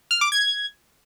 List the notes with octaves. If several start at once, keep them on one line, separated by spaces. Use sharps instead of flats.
F6
D6
G#6